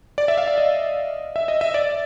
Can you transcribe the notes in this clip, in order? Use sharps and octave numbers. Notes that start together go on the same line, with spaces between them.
D5
E5
F5
E5
D#5
E5
D#5
E5
D5